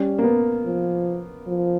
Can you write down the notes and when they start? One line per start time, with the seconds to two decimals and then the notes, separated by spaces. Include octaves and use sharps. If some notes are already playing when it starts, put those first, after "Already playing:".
Already playing: G3 C#4
0.19 A#3
0.24 B3
0.66 F3
1.47 F3